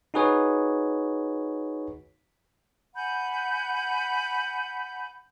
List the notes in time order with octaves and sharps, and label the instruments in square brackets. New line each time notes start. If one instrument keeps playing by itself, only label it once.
[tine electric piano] D#4 F#4 G#4 B4 C#5
[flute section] F#5 G#5 B5 G6